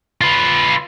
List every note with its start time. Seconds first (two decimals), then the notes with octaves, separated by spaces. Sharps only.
0.21 F4 B4